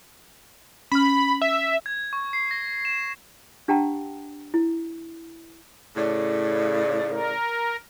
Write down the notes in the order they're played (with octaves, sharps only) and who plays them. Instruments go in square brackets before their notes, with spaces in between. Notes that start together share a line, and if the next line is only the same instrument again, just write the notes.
[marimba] C#4 F6 [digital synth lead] B5
[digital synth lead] E5
[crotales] G#6
C#6
C7
A#6
E7
[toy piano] D4 G4 F#5 G5 A5 A#5
E4
[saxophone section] A2 C#3 [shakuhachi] D5
[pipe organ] A#4